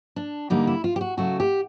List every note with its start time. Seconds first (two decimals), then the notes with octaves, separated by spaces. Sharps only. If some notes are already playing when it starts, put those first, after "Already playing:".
0.16 D4
0.50 D3 G3 A#3 D#4
0.67 E4
0.84 F4
0.96 G4
1.01 F#4
1.17 C#3 F#3 A3 F#4
1.40 G4